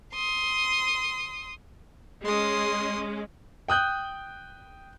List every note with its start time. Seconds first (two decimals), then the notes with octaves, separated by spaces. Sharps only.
0.14 C6 D#6
2.24 G#3 C#4 C6 D#6
3.68 G5 D#6 F#6 G6